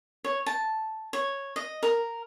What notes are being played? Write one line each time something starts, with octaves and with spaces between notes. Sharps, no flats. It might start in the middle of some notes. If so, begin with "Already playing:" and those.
C#5
A5
C#5
D#5
A#4